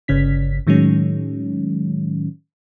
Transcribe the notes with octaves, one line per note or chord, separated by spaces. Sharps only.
G1 C#3 C#4 B6
A2 D#3 F#3 G#3 C#4